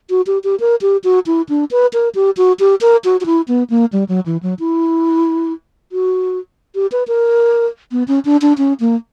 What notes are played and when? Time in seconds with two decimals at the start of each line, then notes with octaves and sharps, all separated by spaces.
0.10 F#4
0.27 G4
0.44 G4
0.60 A#4
0.82 G4
1.04 F#4
1.26 E4
1.49 D4
1.71 B4
1.93 A#4
2.15 G4
2.37 F#4
2.60 G4
2.81 A#4
3.04 F#4
3.21 F#4
3.26 E4
3.48 B3
3.70 A#3
3.93 G3
4.09 F#3
4.26 E3
4.43 F#3
4.59 E4
5.92 F#4
6.75 G4
6.92 B4
7.08 A#4
7.92 B3
8.08 C#4
8.25 D4
8.42 D4
8.58 C#4
8.80 A#3